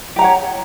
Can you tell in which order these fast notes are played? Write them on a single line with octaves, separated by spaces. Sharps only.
G4 A#5 F#5 C#5